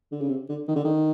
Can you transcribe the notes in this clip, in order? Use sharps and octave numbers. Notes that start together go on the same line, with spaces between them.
D3
C#3
C3
D3
D#3
D3
D#3